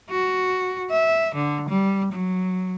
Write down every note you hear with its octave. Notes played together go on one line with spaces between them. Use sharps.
F#4
E5
D3
G3
F#3